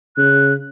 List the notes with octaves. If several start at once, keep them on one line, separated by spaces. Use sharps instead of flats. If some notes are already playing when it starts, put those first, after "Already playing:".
C#3 F#6